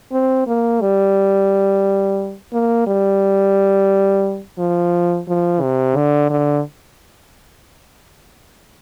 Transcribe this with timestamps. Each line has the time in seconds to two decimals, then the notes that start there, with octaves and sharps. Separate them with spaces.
0.12 C4
0.47 A#3
0.81 G3
2.53 A#3
2.87 G3
4.59 F3
5.28 F3
5.62 C3
5.96 D3
6.30 D3